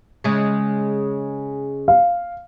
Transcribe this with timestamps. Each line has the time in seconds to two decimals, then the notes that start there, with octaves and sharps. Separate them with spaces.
0.24 C#3 G#3
1.88 F5